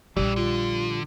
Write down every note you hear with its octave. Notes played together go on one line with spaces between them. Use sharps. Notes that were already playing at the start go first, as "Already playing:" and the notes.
A#1 G2 E3 F3 G3
D3 F4